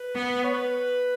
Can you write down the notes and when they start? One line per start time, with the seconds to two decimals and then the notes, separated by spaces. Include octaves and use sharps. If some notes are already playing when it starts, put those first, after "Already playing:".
Already playing: B4
0.14 B3
0.44 C#5
0.54 B4